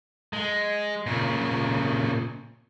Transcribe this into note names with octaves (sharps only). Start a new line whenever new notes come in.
G#3
A#2 C#3